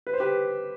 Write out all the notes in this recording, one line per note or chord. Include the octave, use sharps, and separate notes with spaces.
B4
C5
G4 B4